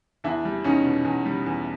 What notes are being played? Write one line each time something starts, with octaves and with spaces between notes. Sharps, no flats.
E2 D4 E4
G3
E2 C#4 D#4
B2
E2
G3
E2